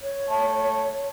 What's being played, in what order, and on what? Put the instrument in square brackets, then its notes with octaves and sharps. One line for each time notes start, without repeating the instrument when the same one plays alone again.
[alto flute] C#5
[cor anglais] A3